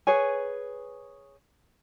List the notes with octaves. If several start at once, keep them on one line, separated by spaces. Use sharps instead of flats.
G#4 B4 C#5 G#5